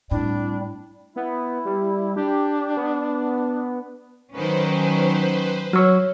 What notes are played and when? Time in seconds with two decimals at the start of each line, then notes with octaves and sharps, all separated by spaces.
0.11 A2 G3 C4 D4 E4
1.16 B3 E4
1.65 G3
2.16 D4 G4
2.77 B3
4.33 D#3 F#3 C#4 B4 C5
5.73 F#3 C#5 C#6 E6 F6